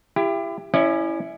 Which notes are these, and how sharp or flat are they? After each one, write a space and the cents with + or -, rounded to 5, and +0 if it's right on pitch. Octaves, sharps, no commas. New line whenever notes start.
E4 +30 G4 +20
C#4 +0 E4 +0 D5 +45